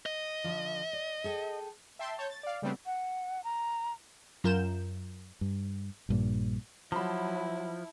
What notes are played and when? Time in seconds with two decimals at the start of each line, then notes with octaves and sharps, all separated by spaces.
0.06 D#5
0.44 D3 D#3 F3
0.93 D5
1.24 G#4 A4 G5
1.99 E5 G5 A5 C6
2.18 C#5 A5 G6
2.30 A6
2.43 D5 F5
2.62 C#3 G3 A3 B3 C4 D4
2.86 F#5
3.44 A#5
4.44 F#2 F4 A#4 G6 E7
5.41 G2
6.09 A#1 G2 A#2
6.92 F3 F#3 E4 A5 B5